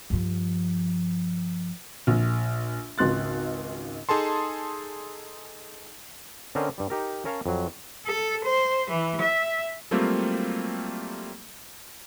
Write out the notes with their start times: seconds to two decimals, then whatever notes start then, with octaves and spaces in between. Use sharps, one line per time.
0.10 G2 F3
2.07 A#1
2.98 G#1 C#2 C6 F#6 A6
4.09 D#4 G#4 A4 A5 C6
6.55 D3 C4 C#4 A#4 C5 D#5
6.78 G2 G3
6.90 D#4 G4 A#4
7.25 C#4 A#4 C#5 F5 A5
7.46 F2 F#3
8.06 A4
8.44 C5
8.90 E3
9.21 E5
9.91 F#3 G3 A3 A#3 C4 F4